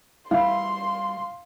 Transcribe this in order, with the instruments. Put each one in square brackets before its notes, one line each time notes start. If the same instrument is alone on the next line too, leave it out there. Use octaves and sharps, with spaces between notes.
[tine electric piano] G3 [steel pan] E4 [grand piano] F5 [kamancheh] C6